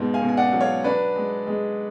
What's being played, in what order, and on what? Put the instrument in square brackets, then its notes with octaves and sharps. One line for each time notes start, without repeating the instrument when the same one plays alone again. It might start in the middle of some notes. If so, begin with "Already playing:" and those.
Already playing: [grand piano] G#2 B2
F5 G#5
B2
G#5
D5 F#5
F#3
C#5 F5
D4 B4 D5
G#3
G#3